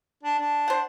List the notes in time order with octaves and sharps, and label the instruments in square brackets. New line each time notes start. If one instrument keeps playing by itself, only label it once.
[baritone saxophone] D4
D4
[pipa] C5 F#5